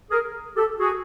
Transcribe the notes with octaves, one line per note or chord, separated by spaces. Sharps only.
G#4 A#4
G4 A4
F#4 G#4